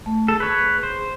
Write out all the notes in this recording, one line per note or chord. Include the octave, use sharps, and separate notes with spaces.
A3
G#4 A4
B4 C#5
C5